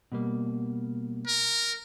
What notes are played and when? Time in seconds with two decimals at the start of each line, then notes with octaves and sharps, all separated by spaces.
0.12 B2 G3 A#3
1.28 A#4